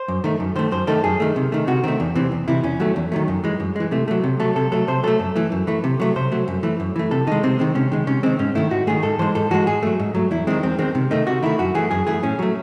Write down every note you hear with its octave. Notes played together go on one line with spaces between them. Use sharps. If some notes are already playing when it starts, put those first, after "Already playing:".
Already playing: C5
F#2
D#3 A3
F#2
D#3 A3 C5
F#2 C5
D#3 A3 A4
F#2 G#4
D#3 A3
C3
D#3 A3
C3 F#4
D#3 A3 C4
E2
C3 E3 C4
E2
C3 E3 E4
E2 C#4
D#3 F#3 A3
E2
D#3 F#3 A3
F#2
E3 G#3
F#2
E3 G#3
C3 A3
F#3 A3
C3
F#3 A3 A4
C3 A4
F#3 A3 A4
C3 C5
F#3 A3 A4
F#2
E3 A3
F#2
E3 A3
C3
F#3 A3
C3 C5
F#3 A3
F#2
E3 A3
F#2
E3 A3
C3 A4
D#3 G#3 D#4
C3 C4
D#3 G#3 C4
C3 C#4
D#3 G#3
C3 C#4
D#3 G#3 C4
G#2 C#4
D#3 A3 E4
G#2 F#4
D#3 A3 G#4
G#2 A4
E3 G#3 C5
G#2 A4
E3 G#3 F#4
G#2 G#4
F#3 A3
G#2
F#3 A3
E2 E4
D#3 G#3 C4
E2 C4
D#3 G#3 C4
C3
D#3 A3 D#4
C3 F#4
D#3 A3 E4
F#2 F#4
E3 A3 G#4
F#2 G#4
E3 A3 G#4
A2 C#4
F#3 A3